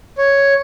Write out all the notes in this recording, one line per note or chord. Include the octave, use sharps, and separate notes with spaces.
C#5